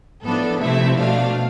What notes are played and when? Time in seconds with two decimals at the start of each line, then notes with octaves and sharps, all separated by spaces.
0.24 A2 F3 B3 D4 A4
0.61 C3 F3 A3 C4 E4 E5
0.98 B2 A3 D4 F5